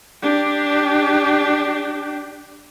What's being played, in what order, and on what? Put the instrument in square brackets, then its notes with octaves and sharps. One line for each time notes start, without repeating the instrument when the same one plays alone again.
[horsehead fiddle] D4 G4